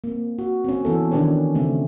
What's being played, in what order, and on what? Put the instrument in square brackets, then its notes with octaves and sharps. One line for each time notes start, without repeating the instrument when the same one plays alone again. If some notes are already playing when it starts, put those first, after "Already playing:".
[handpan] A#3 C4
F#4
C4 C#4
E3 B3 A4
D#3 C#4 D4 G4 B4 C#5
C#3 A3 C4